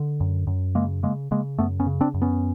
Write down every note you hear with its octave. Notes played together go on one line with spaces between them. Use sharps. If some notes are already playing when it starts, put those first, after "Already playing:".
Already playing: D3
F#2
F#2
C#3 G#3 A#3
C#3 G#3 A#3
C#3 G#3 A#3
F#2 A3 B3
B3 C#4
C#3
C4 D4
F#2
B3 C#4